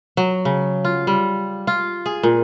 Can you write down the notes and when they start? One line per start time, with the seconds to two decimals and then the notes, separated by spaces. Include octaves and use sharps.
0.17 F#3
0.45 C#3
0.85 F4
1.07 G3
1.67 F4
2.06 G#4
2.23 A#2